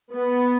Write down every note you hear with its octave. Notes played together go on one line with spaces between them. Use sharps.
B3